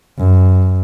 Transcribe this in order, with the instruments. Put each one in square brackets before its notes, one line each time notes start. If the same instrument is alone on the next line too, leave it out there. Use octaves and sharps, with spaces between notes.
[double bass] F#2